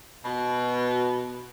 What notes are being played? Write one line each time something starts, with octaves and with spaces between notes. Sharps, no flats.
B2